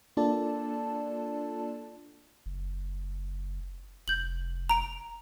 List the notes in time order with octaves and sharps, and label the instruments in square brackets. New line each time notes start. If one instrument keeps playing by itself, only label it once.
[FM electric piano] A#3 D4 F4 A4 D5 A5
[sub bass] F#1
[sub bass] F1 [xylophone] G6 F#7
[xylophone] A#5 D7 F7